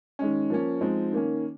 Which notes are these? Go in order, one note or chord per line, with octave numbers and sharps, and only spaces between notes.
D#3 G#3 C#4
F3 A#3 C#4
F3 G#3 C4 D#4
D#3 A#3 C#4